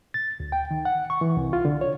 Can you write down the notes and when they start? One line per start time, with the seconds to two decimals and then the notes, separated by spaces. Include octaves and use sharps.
0.14 A6
0.40 D2
0.52 G5
0.71 D#3
0.85 F#5
1.10 C#6
1.21 E3
1.37 C2
1.53 F4
1.65 D3
1.81 C#5